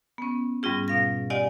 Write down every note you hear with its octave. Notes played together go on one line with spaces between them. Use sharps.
B3 C#4
G#2 G3 C#4 F4 G#4
B2 F5 A#6
G4 D5 D#5 F#5 G#5